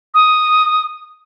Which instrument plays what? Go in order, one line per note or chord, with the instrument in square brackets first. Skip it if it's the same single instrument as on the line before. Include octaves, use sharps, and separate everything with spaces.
[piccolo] D#6